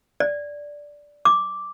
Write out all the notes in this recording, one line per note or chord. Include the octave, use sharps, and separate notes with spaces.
D5
D6